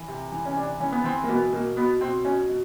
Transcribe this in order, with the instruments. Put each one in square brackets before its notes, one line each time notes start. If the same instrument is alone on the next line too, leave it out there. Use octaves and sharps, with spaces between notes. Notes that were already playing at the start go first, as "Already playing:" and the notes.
Already playing: [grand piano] E3
C3
E3
C#4
C3 D4
E3 C#4
B3
E3 C4
A#3
B2 B3
B2 A#3
B2 B3
B2 C4
B2 C#4
B2